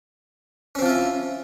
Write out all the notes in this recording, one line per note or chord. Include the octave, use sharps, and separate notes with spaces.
F3 C4 C#4 E4 F4